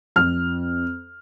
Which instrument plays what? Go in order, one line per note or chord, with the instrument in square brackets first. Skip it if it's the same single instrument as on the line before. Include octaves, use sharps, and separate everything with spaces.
[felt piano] F2 F6